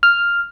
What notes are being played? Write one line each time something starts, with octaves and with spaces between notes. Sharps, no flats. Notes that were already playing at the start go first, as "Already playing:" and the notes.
F6